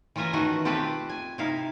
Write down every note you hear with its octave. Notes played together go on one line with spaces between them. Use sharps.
E3 C#4 F4 E5 G#5 A#5
B2 D#3 E3 A3 F#4
C4 F4 G4 A4 B4
G#5
C3 D#4 E4 F5